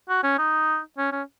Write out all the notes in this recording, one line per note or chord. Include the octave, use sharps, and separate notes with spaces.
F#4
C#4
D#4
C#4
C#4